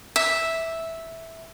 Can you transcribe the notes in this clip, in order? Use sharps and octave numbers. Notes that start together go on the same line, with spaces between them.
E5